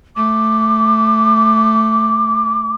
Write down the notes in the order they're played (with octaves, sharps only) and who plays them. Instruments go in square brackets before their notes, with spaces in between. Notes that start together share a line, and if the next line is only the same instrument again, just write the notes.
[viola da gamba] A3 [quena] D6